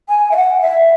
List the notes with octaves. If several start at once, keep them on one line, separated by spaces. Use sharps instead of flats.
G#5
E5
F#5
E5